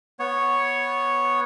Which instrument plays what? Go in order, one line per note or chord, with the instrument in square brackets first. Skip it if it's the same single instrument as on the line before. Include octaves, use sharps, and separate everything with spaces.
[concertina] B3 C#5